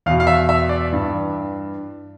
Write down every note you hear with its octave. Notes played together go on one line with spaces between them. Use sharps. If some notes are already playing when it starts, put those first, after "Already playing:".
E2 B2 F5
F5
E5
E5
D5
G2 E3